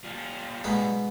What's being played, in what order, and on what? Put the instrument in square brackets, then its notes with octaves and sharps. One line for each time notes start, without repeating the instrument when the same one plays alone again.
[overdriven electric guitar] G3 F4
[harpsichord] G#2 B2 B3